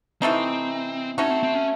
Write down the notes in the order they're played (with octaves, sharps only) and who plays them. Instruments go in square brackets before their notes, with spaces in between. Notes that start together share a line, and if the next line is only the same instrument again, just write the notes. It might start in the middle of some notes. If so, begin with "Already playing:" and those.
[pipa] C3 E3 A3 D#4 [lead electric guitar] C4
[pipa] A3 D#4 F#4 [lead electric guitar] C#4
[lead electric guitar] C4
C4
C#4